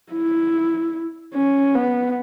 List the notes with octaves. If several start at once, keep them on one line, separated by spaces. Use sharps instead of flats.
E4
C#4
B3